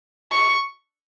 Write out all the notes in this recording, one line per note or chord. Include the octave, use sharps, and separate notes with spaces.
C#6